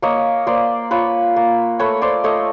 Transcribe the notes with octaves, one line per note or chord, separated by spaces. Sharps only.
A#3 C#5 D#5
A#3 C5 D5
F4 B4 C#5
A#3
A3 B4 C#5
C5 D5
A3 C#5 D#5